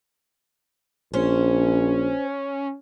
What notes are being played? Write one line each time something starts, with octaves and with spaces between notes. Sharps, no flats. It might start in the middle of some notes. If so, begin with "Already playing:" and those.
A#1 C#4 C5